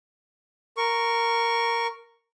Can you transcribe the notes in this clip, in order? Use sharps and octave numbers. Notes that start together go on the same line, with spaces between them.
A#4 C#6